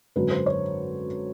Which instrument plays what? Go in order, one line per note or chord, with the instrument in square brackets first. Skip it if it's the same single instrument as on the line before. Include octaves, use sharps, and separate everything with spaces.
[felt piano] G#1 F#2 D3 F#3 B4
C5
C#5